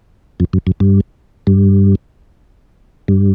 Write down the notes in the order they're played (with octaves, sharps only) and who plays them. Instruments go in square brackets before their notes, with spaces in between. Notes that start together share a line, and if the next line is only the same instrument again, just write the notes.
[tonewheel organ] F2
F#2
F#2
G2
G2
G2